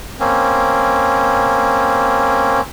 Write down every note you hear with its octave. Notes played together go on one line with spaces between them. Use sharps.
A#3 C4 C#4